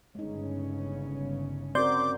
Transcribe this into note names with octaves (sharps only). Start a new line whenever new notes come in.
G1 C#3 G#3 C#4 D#4
C4 F#4 A#4 D5 C6 D6 G6